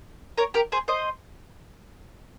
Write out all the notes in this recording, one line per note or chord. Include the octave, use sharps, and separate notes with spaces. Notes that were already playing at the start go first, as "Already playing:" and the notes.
A#4 C#5
G4 A#4
G#4 C5
C5 D#5